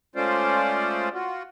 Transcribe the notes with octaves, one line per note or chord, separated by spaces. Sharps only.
G#3 A3 C#4 F4 C5 D5
F4 F#4